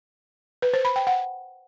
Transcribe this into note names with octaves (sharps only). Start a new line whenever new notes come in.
B4
C5
B5
G5
F#5